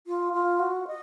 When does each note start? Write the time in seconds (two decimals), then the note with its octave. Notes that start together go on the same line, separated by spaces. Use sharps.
0.07 F4
0.33 F4
0.59 F#4
0.87 D#5